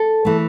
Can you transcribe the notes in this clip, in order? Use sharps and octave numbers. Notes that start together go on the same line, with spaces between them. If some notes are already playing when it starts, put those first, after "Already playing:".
Already playing: A4
E3 A3